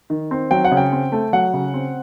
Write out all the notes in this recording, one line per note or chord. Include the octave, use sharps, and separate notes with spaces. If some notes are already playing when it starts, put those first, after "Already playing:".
D#3
C4
F#3 G5
F#5
C#3
G5
C4
A3
F#3 F#5
C#3
C4